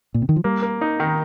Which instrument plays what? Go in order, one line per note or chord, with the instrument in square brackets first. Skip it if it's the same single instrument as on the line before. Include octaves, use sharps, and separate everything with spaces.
[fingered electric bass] A#2
C3
D#3
F3
[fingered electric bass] G3 [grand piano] A#3
[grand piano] A#3
D#4
D#3